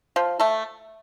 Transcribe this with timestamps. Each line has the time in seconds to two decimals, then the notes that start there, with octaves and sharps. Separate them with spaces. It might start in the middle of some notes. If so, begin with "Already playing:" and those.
0.16 F3 F4
0.40 A3 A4